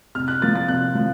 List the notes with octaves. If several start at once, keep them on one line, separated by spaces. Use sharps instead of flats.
C3 F6
F#6
F3 A#3 A6
A6
C3 F#6
F3